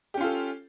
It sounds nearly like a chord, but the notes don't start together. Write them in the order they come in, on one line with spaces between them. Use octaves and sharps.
G4 C#4 F4 A4